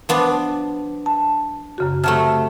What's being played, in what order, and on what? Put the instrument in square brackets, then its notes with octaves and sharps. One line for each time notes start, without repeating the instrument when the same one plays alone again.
[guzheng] F3 B3 D4
[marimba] A5
F#2 C#3 F#4
[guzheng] C3 F#3 A3 [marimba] A5 F6